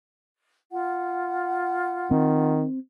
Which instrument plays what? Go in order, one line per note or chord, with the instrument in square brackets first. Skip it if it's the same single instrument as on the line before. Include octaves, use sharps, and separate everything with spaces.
[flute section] F4 F#5
[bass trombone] D#3 [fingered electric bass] C4